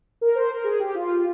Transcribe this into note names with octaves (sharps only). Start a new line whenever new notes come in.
A#4
C5
A#4
G#4
G4
F4